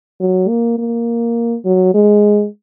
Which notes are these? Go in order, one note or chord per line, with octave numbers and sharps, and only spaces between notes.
F#3
A#3
A#3
F#3
G#3